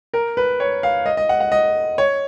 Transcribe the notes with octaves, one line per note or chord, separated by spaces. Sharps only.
A#4
B4
C#5
F5
D#5
D#5
F#5
F#5
D#5
C#5